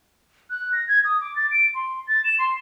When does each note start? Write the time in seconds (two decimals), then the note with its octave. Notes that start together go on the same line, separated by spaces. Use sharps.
0.50 F#6
0.73 A#6
0.88 G#6
1.05 D#6
1.21 D6
1.36 A6
1.51 D7
1.75 C6
2.07 A6
2.24 E7
2.39 C6